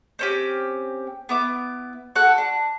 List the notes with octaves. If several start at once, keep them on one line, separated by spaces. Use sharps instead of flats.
C4 C#4 G4
B3 E4 D6
F#4 A4 F#5
D4